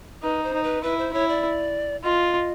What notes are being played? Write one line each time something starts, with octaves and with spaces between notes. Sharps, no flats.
D#4 B4
C5
D#4
B4
E4 B4
C5
E4 C#5
D5
F4 D#5